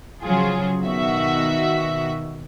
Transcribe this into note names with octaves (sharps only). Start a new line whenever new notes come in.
C#3 F3 F#3 F4 G#4
B2 D#3 F#4 E5